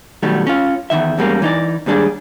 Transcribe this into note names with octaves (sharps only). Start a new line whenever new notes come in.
B2 D#3 F#3 G3 A3
C#4 F4
E2 A#2 D#3 E5
E2 G#2 G3 A#3 C#4
E3 D#4 D5
D#2 G#2 G3 D4 G#4